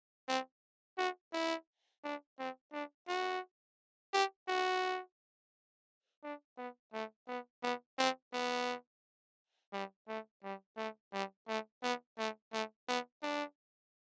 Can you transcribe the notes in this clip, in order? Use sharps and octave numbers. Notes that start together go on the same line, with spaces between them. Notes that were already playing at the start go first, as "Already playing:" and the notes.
C4
F#4
E4
D4
C4
D4
F#4
G4
F#4
D4
B3
A3
B3
B3
C4
B3
G3
A3
G3
A3
G3
A3
B3
A3
A3
B3
D4